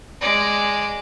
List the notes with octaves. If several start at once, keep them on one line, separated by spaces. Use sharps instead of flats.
G#3 D5